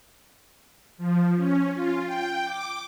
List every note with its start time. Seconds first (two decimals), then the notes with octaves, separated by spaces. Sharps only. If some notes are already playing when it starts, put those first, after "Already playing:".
0.98 F3
1.36 C#4
1.72 F4
2.05 G5
2.44 D6